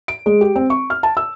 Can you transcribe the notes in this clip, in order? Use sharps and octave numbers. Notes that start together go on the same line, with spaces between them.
D7
G#3
G4
C4
C#6
F6
A5
E6